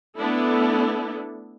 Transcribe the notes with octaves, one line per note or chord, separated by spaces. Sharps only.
A3 B3 D4 E4 A4